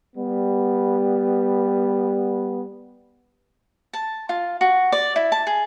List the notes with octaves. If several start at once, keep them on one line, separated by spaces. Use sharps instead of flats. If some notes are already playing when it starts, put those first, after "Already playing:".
G3 B3
A5
F4
F#4
D5
E4
A5
G#4